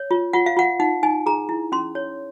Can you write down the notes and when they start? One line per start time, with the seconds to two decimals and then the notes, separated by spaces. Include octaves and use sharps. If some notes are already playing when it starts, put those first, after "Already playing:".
Already playing: C#5
0.11 F4
0.33 F4 F#5
0.46 F5
0.57 F4 F#5
0.80 D#4 F#5
1.03 D#4 G#5
1.26 G#4 A#5
1.49 E4
1.72 C#4 C6
1.95 C#5